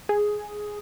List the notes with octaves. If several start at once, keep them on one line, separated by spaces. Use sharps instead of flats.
G#4